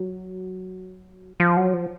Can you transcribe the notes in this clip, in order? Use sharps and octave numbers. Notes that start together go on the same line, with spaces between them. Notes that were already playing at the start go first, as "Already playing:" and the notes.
Already playing: F#3
F3
F#3
F3